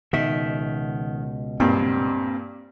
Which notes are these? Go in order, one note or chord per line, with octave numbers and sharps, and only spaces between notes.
C#2 B2 D#3 E5
G2 A#2 C4